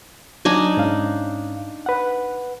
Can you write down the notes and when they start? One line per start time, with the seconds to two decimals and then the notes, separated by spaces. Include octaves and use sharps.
0.45 F#3 D4 D#4 G#5
0.77 G#2 C#4 F5
1.86 B4 F#5